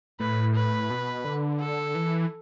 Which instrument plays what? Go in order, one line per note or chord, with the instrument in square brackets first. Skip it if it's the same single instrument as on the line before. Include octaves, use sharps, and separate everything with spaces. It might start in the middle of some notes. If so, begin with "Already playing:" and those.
[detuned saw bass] A2 [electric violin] B4
[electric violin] B4
[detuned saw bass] B2
D3
[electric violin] A4
[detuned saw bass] E3